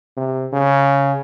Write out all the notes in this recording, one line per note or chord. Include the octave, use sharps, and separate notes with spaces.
C3
C#3